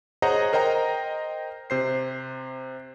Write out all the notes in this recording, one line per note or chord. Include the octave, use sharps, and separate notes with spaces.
G#4 C5 C#5 D#5 F#5 A#5
A#4 C5 D#5 G5 A#5
C3 C5 C7